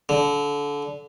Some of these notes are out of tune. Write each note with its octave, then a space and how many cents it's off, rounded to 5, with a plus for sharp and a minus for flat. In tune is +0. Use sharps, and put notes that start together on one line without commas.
D3 -25